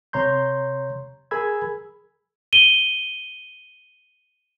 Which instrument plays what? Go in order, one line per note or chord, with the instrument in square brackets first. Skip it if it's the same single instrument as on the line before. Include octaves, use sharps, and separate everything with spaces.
[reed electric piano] C3 C#5 A#5 C6 G6
G#4 A#4 G#5 B5 E6 G#6
[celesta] D#7 G7